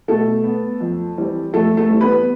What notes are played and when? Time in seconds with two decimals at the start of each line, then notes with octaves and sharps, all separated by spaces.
0.08 B2 A3 A4
0.44 B3
0.80 F2
1.17 E3 G3 C4
1.53 F2 A3 A4
1.77 A3 A4
1.89 E3 G3 C4
2.01 B3 B4